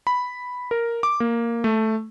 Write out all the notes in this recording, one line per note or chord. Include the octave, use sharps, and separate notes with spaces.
B5
A#4
D6
A#3
A3